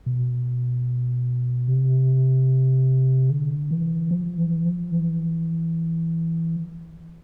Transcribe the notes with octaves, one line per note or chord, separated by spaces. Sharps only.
B2
C3
D3
E3
F3
E3
F3
E3